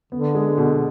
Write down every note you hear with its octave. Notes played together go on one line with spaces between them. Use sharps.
D3 B3
G#3
B2